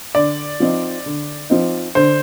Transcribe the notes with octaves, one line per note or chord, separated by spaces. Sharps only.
D3 D5
F3 C4 D#4
D3
F3 C4 D#4
D3 C5